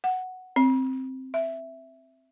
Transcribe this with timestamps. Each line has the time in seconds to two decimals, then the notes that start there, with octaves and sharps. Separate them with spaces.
0.04 F#5
0.56 C4
1.34 E5